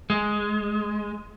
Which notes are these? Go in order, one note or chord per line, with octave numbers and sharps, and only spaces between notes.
G#3